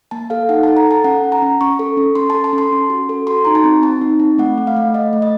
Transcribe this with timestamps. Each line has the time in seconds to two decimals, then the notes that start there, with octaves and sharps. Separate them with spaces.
0.11 A#3 A5
0.30 A4 F5
0.49 D#4 F#5
0.63 A5
0.68 A4
0.77 A#5
0.86 A4 A5
1.04 C#4 F#5
1.24 C#4
1.32 A#5
1.42 C#4
1.61 C#4 C#6
1.79 A4
1.97 C#4
2.15 C#4 C6
2.30 A5
2.34 A4
2.44 A5
2.53 C#4
2.58 C6
2.72 C#4
2.90 F#4
3.09 A4
3.27 F#4 C6
3.45 D#4 A#5
3.55 A5
3.64 C4
3.82 C4 A5
4.01 D#4
4.20 C4
4.38 A3 F#5
4.58 A3
4.67 F5
4.76 A3
4.94 A3 D#5
5.13 A3
5.22 D#5